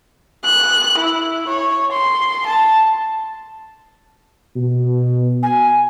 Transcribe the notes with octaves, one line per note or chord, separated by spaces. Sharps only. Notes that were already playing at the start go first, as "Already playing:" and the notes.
F#6
E4
C#5
C6
A5
B2
G#5